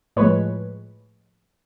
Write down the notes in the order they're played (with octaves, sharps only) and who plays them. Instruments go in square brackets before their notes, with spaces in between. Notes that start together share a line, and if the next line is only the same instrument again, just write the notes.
[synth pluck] A2 F3 G#3 B4 C#5